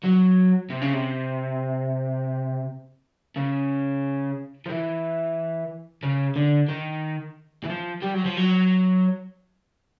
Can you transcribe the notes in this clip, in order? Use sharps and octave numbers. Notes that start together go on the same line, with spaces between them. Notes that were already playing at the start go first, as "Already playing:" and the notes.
F#3
C3
C#3
C3
C#3
F3
E3
C#3
D3
D#3
E3
F3
G3
F#3
F3
F#3